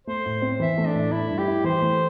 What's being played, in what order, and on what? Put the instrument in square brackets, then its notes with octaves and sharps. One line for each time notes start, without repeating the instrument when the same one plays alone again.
[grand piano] A3 [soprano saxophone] C5
[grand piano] A2
C4
[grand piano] E3 [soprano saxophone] E5
[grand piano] A3
[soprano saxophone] D4
[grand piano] A2
[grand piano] A3 [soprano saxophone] E4
[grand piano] G2
[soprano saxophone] G4
[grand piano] E4
[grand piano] E3 [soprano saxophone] C5
[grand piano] A3